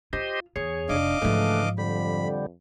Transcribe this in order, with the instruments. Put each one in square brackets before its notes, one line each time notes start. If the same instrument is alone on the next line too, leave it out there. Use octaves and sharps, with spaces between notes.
[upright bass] F4 [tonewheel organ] G4 C5 D#5
[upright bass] E2 [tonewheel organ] G#4 C#5
[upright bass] F1 [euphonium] D4 [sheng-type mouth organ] D#5 F5 D6
[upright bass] G#2 F3 [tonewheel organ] C#3 E3 D4 [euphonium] A3
[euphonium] F2 [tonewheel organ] D3 G3 [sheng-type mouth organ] B5